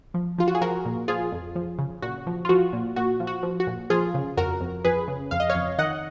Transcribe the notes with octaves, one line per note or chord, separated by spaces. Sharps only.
F3
F3 F4
F#4
G#4
F3 F#4 A#4
A#2
F3 F4 G#4
F2
F3
C#3
A#2 F#4
F3
F4
F3 F#4
A#2
A#2 F#4
F3
F#4
F3
F#4
A#2
F3 F4 G#4
C#3
F2 F#4 A#4
F2
F2 G#4 B4
C#3
F2 F5
D#5
C#5 F5
F2
D#3 D#5 F#5